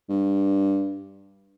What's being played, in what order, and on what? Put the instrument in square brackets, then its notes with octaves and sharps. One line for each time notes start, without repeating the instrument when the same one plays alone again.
[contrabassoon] G2